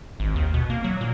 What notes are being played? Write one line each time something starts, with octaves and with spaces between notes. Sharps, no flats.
G#1
D#2
B2
A#3
F#3
A#2